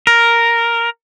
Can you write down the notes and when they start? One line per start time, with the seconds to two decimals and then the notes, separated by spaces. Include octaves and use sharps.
0.07 A#4